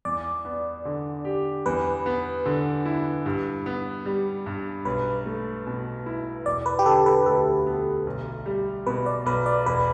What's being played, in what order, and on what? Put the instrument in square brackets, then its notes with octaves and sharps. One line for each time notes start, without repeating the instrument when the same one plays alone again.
[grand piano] E2 [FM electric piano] D5
[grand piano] B3
D3
G4
[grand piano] E2 [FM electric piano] B4
[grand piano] B3
D3
E4
G2
B3
G3
G2
[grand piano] B1 [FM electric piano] B4
[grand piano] A3
B2
E4
[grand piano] E1 [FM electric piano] D5
[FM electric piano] B4
G4
[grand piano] D3 [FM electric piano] A4
[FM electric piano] B4
[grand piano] D2 [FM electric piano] A4
[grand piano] B3
B1
G3
[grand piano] B2 [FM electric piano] B4
[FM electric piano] D5
[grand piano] B1 [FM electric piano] B4
[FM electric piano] D5
[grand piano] E1 [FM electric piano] B4